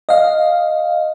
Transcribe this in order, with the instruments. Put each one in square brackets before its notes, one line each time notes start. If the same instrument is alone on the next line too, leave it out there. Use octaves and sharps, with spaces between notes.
[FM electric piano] D#5 F5